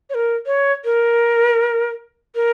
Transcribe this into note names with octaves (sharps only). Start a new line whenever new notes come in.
C#5
A#4
C#5
A#4
A#4